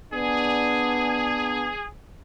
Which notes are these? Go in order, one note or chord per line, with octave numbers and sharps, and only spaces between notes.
B3 D4 G#4